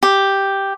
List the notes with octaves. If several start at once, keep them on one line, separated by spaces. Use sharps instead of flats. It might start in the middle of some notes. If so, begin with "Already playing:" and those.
G4